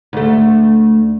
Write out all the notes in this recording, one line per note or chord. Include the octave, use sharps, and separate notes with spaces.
D2 A3